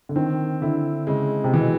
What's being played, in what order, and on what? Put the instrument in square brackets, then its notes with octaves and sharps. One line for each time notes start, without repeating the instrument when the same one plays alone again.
[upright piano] D3
[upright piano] D#3 [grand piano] C4
[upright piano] D3 [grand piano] E4
[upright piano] C#3 [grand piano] G#3
[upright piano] C3
[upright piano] B2 [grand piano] E3